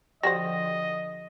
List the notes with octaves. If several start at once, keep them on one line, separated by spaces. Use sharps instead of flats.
D3 F3 G3 F#4 C5 D#5 A#6